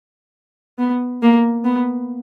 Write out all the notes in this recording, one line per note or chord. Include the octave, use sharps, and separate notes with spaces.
B3
A#3
B3